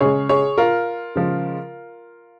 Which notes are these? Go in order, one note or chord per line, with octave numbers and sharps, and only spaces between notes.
C#3 G#3 G#4 C#5
G#4 C#5
F4 A#4
C#3 F3 G#3